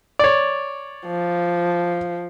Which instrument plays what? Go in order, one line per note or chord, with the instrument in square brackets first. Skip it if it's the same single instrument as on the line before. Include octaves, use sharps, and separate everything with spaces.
[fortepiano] C#5 D5
[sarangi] F3